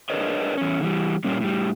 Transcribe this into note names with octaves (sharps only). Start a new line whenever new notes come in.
D4 G#4 A#4 B4 C#5 D#5
E2 C#4
D3 E3 G3
G2 A#2 G3 A#3 C#4
A2 G3